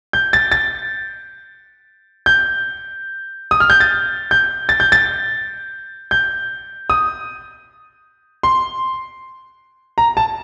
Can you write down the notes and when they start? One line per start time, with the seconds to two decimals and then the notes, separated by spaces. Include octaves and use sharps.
0.13 G6
0.33 A6
0.52 A6
2.26 G6
3.51 D#6
3.60 F6
3.70 G6
3.80 A6
4.31 G6
4.69 A6
4.80 G6
4.92 A6
6.11 G6
6.90 D#6
8.43 C6
9.98 A#5
10.17 A5